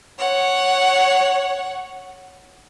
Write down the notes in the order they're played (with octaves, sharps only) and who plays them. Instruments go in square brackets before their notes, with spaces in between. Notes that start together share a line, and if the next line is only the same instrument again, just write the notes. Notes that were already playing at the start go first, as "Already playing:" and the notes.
[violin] C#5 F#5